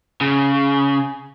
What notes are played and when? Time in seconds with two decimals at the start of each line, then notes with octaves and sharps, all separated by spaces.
0.21 C#3